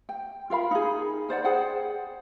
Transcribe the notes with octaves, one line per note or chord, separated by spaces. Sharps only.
G5
F4 A#4 F5 B5
D#4 G#4
A#4 C5 D5 F#5
G#4 C5 F#5 G5